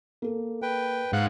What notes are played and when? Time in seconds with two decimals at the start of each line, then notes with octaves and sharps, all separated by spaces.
0.22 A#3 A4
0.62 B4 G5
1.13 G#2 F5 F#5 F#6